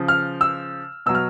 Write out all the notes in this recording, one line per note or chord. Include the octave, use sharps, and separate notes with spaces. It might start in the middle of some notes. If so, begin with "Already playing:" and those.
Already playing: C#3 F3
F6
E6
B2 F#3 E6
F6